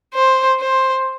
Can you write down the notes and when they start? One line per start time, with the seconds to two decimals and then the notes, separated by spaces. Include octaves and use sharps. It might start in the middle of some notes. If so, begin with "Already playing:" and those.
0.14 C5
0.60 C5